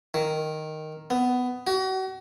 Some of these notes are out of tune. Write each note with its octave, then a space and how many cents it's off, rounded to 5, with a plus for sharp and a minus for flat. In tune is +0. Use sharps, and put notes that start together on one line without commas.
D#3 -5
B3 +15
F#4 +35